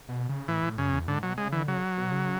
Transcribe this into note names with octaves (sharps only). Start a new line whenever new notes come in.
B2
C#3
A2 E3
A2
F#2 C#3
E2
G#2 D3
B2 F#3
C#3 G#3
D3 E3
C#3 F#3
B2
C#3